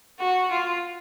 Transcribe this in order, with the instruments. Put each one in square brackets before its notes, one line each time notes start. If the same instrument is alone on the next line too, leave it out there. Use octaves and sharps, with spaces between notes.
[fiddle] F#4
F4